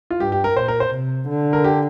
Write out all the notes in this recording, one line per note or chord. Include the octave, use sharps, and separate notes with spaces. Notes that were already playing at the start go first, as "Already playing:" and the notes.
F4
G2 G4
G4
A#4
A#2 C5
A#4
C5
C3
D3
A#4
G4